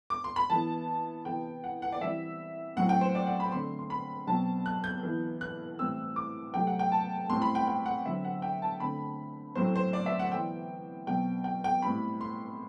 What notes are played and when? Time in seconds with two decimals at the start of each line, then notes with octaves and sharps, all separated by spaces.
0.10 D6
0.24 C6
0.36 B5
0.50 E3 B3 A5
1.25 C3 E3 B3 G5
1.64 F#5
1.82 F#5
1.92 D5
2.01 E3 G3 C4 E5
2.76 A2 F#3 C4 F#5
2.89 G5
3.01 C5
3.15 D5
3.27 F#5
3.40 B5
3.52 D3 A3 C4 C6
3.79 C6
3.90 B5
4.27 B2 F#3 C4 A5
4.66 F#6
4.84 G6
5.03 E3 B3
5.41 F#6
5.79 A2 E3 G3 C4 E6
6.16 D6
6.54 C3 F#3 A3 G5
6.67 F#5
6.79 G5
6.92 A5
7.29 A2 G3 C4 C6
7.42 B5
7.55 G5
7.68 G5
7.86 F#5
8.05 D3 F#3 C4 E5
8.25 F#5
8.42 G5
8.62 A5
8.80 D3 A3 C4 B5
9.55 A2 F#3 A3 C4 C5
9.76 C5
9.93 D5
10.06 E5
10.19 F#5
10.32 E3 B3 G5
11.07 B2 F#3 C4 G5
11.44 G5
11.64 G5
11.82 A2 G3 C4 B5
12.21 C6